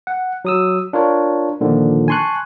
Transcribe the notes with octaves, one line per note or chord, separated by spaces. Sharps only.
F#5
F#3 D#6 E6
D4 F4 A#4 C#5
A#2 D3 D#3 F3
G#5 A5 C6 C#6 F#6